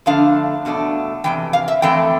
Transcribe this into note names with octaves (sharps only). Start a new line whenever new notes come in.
F2 D3 F3 A3 D4 F5
E2 B2 A3 D4
F2 C3 E3 G5
F5
E5
F2 E3 A3 C4 G5